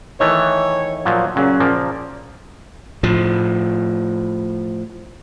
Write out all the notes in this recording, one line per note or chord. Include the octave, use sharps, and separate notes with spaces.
D#3 E3 A3 C#5
A#2 F3 F#3
A#2 C#3 F#3
A#2 F3 A#3
A2 F3